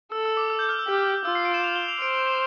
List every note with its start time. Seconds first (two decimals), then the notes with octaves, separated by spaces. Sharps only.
0.12 A4 E6
0.25 E6
0.37 D6
0.50 E6
0.59 G6
0.69 F6
0.79 E6
0.88 G4
1.25 F4 E6
1.35 C7
1.45 D7
1.54 E7
1.64 F7
1.76 G7
1.88 F7
2.02 C5 D7
2.14 D7
2.27 C7